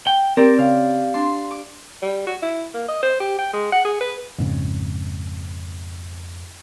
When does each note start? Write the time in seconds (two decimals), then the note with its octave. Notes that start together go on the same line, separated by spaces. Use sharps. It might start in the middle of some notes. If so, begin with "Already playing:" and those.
0.07 G5
0.37 C4 G4 A#4 D5
0.59 C#3 F5
1.14 D4 C6
1.51 D6
2.02 G3
2.27 F#4
2.42 E4
2.74 A#3
2.88 D#5
3.03 C5
3.20 G4
3.38 G5
3.53 G#3
3.72 F#5
3.85 G#4
4.01 B4
4.39 A#1 F2 G#2 C#3